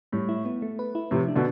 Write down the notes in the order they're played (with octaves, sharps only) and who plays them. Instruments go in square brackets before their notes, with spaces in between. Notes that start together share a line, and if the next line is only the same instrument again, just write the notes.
[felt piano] A2 [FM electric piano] G3
[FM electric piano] E4
B3
A3
B4
E4
[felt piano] A2 C3 [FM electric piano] F3
[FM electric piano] D4
[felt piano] B2 D3